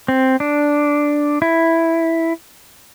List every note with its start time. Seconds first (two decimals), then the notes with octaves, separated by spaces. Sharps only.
0.08 C4
0.40 D4
1.42 E4